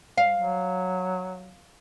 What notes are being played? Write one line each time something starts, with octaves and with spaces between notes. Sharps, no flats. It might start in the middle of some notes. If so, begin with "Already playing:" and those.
F5
F#3